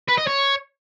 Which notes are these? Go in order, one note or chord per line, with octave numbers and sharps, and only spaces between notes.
B4
D#5
C#5